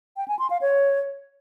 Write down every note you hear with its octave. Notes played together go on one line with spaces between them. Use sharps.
G5
G#5
C6
F5
C#5